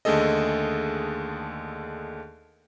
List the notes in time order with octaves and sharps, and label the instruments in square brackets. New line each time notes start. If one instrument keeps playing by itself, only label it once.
[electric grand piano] D#2 D3 A3 G#4 A4 D#5